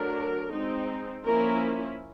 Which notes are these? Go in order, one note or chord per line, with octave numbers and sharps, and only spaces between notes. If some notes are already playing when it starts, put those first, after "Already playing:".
Already playing: F#3 A3 D4 A#4
G#3 C4 D#4
F3 A#3 C#4 E4 A#4